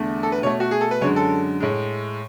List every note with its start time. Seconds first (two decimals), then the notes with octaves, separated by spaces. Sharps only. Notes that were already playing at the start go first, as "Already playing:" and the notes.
Already playing: E2 D3 A3
0.23 A4
0.32 B4
0.42 B2 A3 C#5
0.60 F#4
0.71 G#4
0.81 A4
0.91 B4
1.01 F#2 D3 G#3 C#5
1.16 A4
1.60 A2 G#3